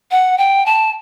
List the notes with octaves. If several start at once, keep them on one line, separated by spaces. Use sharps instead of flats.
F#5
G5
A5